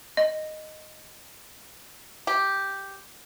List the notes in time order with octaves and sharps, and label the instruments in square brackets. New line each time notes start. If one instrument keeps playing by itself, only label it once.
[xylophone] D#5
[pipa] G4